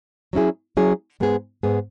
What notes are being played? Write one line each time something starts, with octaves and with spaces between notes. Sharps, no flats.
F#3 C#4 E4 G#4
F#3 C#4 E4 G#4
G#2 G#3 B3 G#4
G#2 G#3 B3 G#4